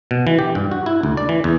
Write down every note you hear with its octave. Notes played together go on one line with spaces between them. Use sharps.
B2
E3
G4
G2
F#4
E4
D2
D5
E3
E2